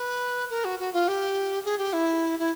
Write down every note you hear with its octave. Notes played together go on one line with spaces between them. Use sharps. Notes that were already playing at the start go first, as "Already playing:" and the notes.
Already playing: B4
A#4
F#4
F#4
F4
G4
G#4
G4
E4
E4